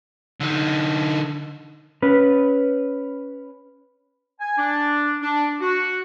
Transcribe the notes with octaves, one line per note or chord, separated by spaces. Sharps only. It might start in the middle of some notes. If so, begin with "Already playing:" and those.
D3 D#4
C#4 B4
G#5
D4
D4
F#4